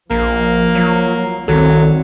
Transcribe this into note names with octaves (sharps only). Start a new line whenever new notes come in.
A#1 F3 A#3
F#3
C2 D#3 F#3 C4 A4